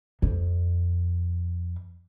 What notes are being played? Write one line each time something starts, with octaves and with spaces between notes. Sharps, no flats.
F2